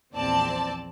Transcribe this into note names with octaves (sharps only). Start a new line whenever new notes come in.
A#1 E2 C4 D5 A5